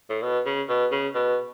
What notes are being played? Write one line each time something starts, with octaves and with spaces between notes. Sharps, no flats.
A2
B2
C#3
B2
C#3
B2